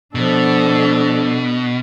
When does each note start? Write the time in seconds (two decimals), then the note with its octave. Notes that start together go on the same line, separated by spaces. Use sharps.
0.15 B2 F3 D4 A4